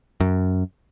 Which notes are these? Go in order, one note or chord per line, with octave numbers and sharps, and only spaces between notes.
F#2